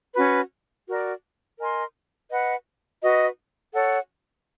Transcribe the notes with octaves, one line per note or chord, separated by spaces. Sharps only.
C#4 F#4 B4
F#4 A#4 D5
A#4 D#5 G#5 C6
B4 D#5 F#5
F#4 B4 D#5
A4 C#5 F#5